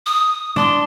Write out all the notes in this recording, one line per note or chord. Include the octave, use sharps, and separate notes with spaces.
D#6
D4 C6